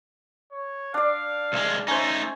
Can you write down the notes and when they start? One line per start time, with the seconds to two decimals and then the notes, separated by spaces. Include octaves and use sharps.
0.52 C#5
0.94 D4 D5 F5
1.53 C2 G#3
1.88 A3 C#4 D#4 C5 A#5